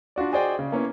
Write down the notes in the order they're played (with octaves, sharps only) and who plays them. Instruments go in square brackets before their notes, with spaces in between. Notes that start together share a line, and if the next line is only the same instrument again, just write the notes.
[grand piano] D4 F4 F#4 D5
F#4 G#4 C5 D5 D#5 G5
C#3
A#3 B3 C#4 E4